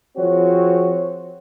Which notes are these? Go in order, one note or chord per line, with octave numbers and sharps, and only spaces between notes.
F3 C4 F#4 G#4 C#5